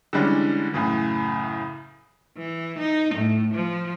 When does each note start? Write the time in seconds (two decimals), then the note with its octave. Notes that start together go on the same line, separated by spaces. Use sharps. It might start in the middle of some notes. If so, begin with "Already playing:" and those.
0.13 D3 E3 G3 G#3 C#4 D4
0.73 F#2 A2 C#3 E3
2.38 E3
2.79 D#4
3.15 A2
3.55 F3